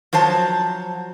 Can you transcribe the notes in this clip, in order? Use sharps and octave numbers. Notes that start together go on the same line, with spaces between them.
F3 F#3 C5 A5